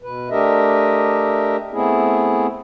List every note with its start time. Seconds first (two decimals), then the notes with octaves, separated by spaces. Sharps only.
0.02 B2 B4
0.30 A3 D4 G4 A#4 D#5 E5
1.72 A3 B3 C4 E4 G#4